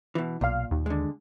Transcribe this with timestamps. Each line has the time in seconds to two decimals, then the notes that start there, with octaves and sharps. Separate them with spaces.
0.15 B2 E3
0.41 B1 A#2 F5
0.71 D#2
0.86 D3 G#3